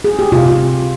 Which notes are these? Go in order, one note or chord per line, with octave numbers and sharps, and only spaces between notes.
G#4
G4
C3 F4
F4